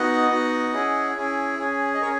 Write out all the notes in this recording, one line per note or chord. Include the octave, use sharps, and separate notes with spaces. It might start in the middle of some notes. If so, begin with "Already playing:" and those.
Already playing: B3 D#4 F#4 D#5 F#5
B3 D#4 F#4
C#4 E4 G#4
C#4 E4 G#4
C#4 G#4
D#5
C#4 G#4 A#4 C#5